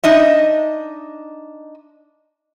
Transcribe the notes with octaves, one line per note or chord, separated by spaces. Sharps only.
D4 D#4 D#5 E5